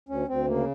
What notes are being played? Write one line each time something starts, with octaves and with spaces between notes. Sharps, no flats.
D2 C#4
D2 C4
C#3 A#3